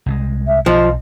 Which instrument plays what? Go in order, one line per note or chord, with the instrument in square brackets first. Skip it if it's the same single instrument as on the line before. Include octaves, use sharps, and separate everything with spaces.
[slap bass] C2 G3 G#3
[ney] E5
[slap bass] B1 [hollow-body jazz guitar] F3 [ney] D#5